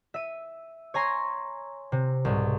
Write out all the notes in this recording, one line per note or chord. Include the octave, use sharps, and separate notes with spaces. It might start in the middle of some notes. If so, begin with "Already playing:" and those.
E5 D#7
C#5 G#5 A#5 C6
C3
C2 G#2 B2